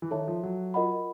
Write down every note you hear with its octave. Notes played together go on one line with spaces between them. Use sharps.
E3
D#3 A4 C#5 E5 A5
F3
F#3
F4 A#4 D#5 F#5 B5